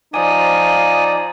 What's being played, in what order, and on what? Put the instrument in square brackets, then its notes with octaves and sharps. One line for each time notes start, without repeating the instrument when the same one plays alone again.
[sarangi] F3 [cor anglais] D#4 [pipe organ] D5 [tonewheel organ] G#5 D#6